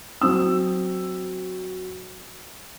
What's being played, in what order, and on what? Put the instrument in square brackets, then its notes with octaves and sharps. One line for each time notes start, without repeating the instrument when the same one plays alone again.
[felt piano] F#3 C4 E6